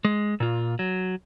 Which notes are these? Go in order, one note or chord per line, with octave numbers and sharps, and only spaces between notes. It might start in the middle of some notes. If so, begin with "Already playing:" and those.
G#3
A#2 F4
F#3